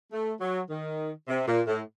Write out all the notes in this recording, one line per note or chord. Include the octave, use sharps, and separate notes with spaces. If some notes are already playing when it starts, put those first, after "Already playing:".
A3
F#3
D#3
C3
A#2
A2